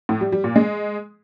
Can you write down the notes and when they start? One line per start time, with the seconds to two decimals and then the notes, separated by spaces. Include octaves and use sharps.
0.09 A2
0.21 G3
0.32 G3
0.44 A#2
0.56 G#3